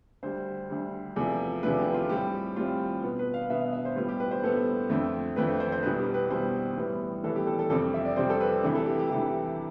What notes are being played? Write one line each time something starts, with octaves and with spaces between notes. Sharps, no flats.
D2 D3 G3 C5
D2 D3 G3
E2 C3 F3 A3
E2 C3 F3 A3 B4
G4
F4
A2 G3 C4 G4
A2 G3 C4 F4
B2 B3
B4
F5
B2 B3 E5
E5
E5
C5
A2 G3 B3 F4
G4
B4
C5
A2 G3 B3 A4
F2 D3 A3 C4
F2 D3 A3 C4 B4
C5
C5
C5
C2 B2 G3 B3 B4
G4
B4
C2 B2 G3 B3 C5
A2 E3 G3 B3
A2 E3 G3 B3 A4
G4
A4
A4
F2 C3 G3 C4 A4
E5
D5
F2 C3 G3 C4 C5
A4
B4
D2 C3 E3
A4
G4
G4
D2 C3 E3 G4